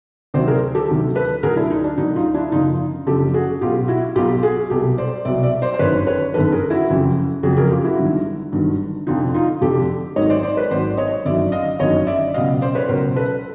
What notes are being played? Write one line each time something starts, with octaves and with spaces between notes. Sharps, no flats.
D2 C3 D#3 F#3 C5 D5
G#4 A#4
G4 A4
D2 C3 D#3 F#3
A4 B4
D2 D3 F#3 G#4 A#4
D4 E4
D#4
D4
D2 D3 F#3 D#4
D#4 F4
D4 E4
F#1 F#2 D3 F3 D#4 F4
F#1 F#2 D3 F3 G4 A4
F#4 G#4
B1 B2 F#3 F4 G4
E4 F#4
B1 B2 F#3 F4 G4
F#4 G#4
C2 B2 F#3 G4 A4
C5 D5
C2 B2 F#3 D5 E5
D5 E5
C5 D5
C5
G1 F#2 D#3 B4 C#5
B4 C#5
G1 F#2 D#3 A4 B4
G#4 A#4
E4 F#4
F#1 F2 C#3 F#3
F#1 F2 C#3 F#3 F#4 G#4
G#4 A#4
F4 G4
E4 F#4
G1 G2 D#3 F#3
G1 G2 D#3 F#3
F1 F2 D3 F3 D#4 F4
D#4 F4
F1 F2 D3 F3 G4 A4
G#1 G#2 D#3 F#3 C#5 D#5
C5 D5
C5 D5
B4 C#5
G#1 G#2 D#3 F#3 C5 D5
C#5 D#5
G1 F#2 D#3 F#3 D5 E5
D#5 F5
G1 F#2 D#3 F#3 C#5 D#5
D5 E5
C#2 B2 F#3 D#5 F5
C5 D5
B4 C#5
C#2 B2 F#3 A#4 C5
A4 B4